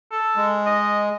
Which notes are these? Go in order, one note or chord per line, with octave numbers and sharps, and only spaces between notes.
A4
G#3
D#5